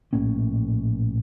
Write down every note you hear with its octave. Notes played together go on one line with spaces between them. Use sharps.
A#1 A2 A#3 C#4